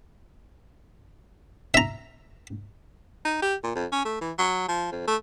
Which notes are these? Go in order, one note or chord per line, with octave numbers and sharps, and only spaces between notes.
E5 A#5
D#4
G4
A#2
F2
C#4
A3
E3
F#3
F3
F2
A3